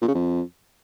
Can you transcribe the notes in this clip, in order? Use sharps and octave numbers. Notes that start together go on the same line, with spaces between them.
A#2
C#3
F2